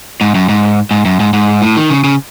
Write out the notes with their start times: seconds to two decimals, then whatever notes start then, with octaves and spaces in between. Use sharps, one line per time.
0.21 G#2
0.35 F#2
0.49 G#2
0.91 G#2
1.06 F#2
1.20 G#2
1.33 G#2
1.62 A2
1.76 D#3
1.90 C#3
2.04 C#3